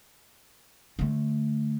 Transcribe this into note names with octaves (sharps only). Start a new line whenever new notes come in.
D3 A3